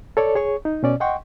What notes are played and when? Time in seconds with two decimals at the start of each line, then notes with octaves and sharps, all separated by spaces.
0.17 A4 C#5 D5
0.35 G#4 C#5 C#6
0.65 D#4
0.83 B2 C#4 D5
1.00 D#5 F#5 G5 C6 C#6